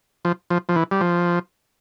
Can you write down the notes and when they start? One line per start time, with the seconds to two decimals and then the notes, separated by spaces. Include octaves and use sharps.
0.25 F3
0.50 F3
0.69 F3
0.76 E3
0.91 G3
1.01 F3